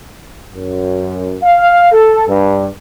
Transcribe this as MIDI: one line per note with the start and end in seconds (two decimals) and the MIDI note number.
0.54 1.37 42
1.42 1.90 77
1.92 2.25 69
2.28 2.66 43